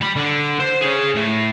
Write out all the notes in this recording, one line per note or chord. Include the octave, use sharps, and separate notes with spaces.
G3 B5
D3
C5
G#4 C#5
A2 A3